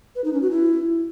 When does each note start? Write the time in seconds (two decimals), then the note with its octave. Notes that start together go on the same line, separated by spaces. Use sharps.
0.15 B4
0.24 D#4
0.33 C#4
0.42 F#4
0.51 E4